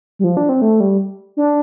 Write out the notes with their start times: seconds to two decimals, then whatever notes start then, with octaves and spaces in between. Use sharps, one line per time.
0.19 G3
0.24 F3
0.37 D4
0.49 C4
0.62 A3
0.80 G3
1.37 D4